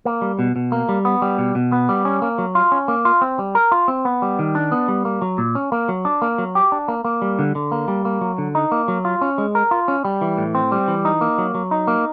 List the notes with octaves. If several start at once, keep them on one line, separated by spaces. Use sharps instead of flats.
A#3
G3
B2
B2
A#3
G3
B3
G3
B2
B2
B3
G3
C#4
A#3
F#3
F4
C#4
A#3
F4
C4
G3
A#4
F4
C4
B3
G3
D#3
D4
B3
G3
A#3
F#3
A#2
C#4
A#3
F#3
D4
A#3
F#3
G4
D4
A#3
A#3
G3
D3
D3
A#3
G3
A#3
F#3
D3
D#4
A#3
F#3
F4
C#4
G#3
A#4
F4
C#4
G3
E3
A2
C4
G3
E3
D#4
A#3
F#3
F#3
D#4
A#3